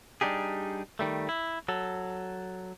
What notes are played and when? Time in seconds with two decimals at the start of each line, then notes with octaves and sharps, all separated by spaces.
0.21 G3 D4 D#4 G4 G#4
0.99 D#3 G3 A3
1.29 E4
1.68 F#3 A4